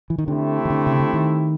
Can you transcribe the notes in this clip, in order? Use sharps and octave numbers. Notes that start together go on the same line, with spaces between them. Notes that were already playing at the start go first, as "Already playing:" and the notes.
E3
D#3
D3 A3 C4 E4 G4
D#3
D3
C#3
D3
D#3